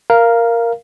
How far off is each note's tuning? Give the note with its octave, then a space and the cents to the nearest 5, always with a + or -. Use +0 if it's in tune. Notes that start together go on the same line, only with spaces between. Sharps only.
A#4 +0 F5 -10